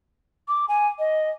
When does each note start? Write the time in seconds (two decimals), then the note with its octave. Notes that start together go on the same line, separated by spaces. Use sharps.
0.48 D6
0.68 G#5
0.99 D#5